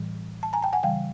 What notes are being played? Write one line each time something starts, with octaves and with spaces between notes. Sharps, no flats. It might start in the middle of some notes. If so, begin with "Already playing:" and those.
Already playing: A2 E3 G3
A5
G#5 A#5
G5 A5
F#5 G#5
C#3 E3 G3 F5 G5